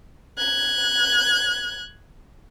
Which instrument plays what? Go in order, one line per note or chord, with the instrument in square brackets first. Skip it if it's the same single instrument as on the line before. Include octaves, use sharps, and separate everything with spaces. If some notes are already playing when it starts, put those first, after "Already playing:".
[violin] F#6 G#6